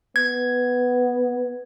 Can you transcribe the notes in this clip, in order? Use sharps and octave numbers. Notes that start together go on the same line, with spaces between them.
B3 G#6